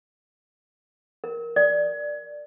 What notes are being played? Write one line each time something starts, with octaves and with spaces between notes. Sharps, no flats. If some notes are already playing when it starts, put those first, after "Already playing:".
A#4
D5